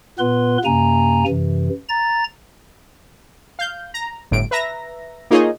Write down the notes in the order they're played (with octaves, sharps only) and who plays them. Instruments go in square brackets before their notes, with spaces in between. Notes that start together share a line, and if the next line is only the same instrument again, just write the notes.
[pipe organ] A#2 B3 B4 C6
F#2 C3 A#3 G#5 A#5
F#2 C3 E3
A#5 A6
[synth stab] F5 G6
A#5
G1 A2 D7
B4 E5 A#5 A#6
A#3 D#4 F4 G#4 C#5 D#5